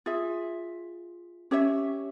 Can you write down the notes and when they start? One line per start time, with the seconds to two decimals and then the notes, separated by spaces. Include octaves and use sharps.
0.06 F4 G#4 E5
1.51 C#4 G4 C#5 E5